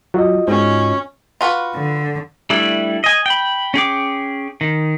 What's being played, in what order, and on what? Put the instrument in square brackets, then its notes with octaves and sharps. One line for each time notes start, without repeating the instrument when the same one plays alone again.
[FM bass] F#3 [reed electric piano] F4 F#4 D#5
[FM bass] G#2 [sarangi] C#4
[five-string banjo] F4 F#4 B4
[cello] D3
[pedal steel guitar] G3 A3 D4 E4
D#5 G#5
G5 B5
C#4 G#4 G5 D6
D#3